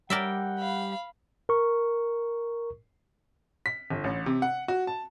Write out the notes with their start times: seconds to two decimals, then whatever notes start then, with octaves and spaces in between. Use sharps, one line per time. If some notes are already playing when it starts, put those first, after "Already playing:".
0.10 G3 A#4 D5 E5 F#5 G5
0.59 F5 B5
1.49 A#4 C#6
3.66 B6
3.90 G1
4.04 A1
4.26 C3
4.42 F#5
4.68 F#4
4.87 A5